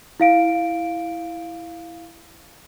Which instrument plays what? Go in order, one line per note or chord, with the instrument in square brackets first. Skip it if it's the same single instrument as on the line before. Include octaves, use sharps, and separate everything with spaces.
[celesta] E4 F5 D7